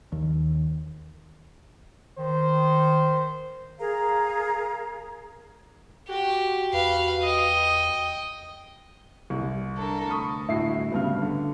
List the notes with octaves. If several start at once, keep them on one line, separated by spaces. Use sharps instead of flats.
D#2
D#3 C5
G#4 A#4 F5 A#5
F#4 G4
E2 B4 F5
D#5 G5 D#6
C2
D4 A4 A#4
D2 B5 C#6 D#6
G1 A2 E4 F#4 C7
G2 C#3 B3 F6
D3